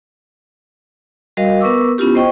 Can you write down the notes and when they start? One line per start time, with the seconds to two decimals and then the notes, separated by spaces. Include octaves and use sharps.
1.37 G3 F#4 A#4 D#5 F5
1.60 B3 A#4 B4 C#6 D6 E6
1.98 B3 C#4 E4 F4 G4
2.15 C5 D#5 G5 C#6